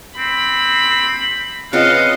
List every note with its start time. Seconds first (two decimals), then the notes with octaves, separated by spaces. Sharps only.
0.18 C4 B5
1.73 C#3 C4 F4 B4 D#5 F5 F#5